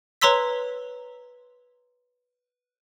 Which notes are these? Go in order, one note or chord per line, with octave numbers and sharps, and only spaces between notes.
B4 C#5 A#5 C6 E6 B6